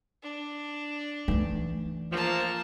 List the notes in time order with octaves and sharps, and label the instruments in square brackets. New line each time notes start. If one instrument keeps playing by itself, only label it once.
[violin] D4
[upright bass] E3 A3
[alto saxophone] F3 [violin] A#3 A5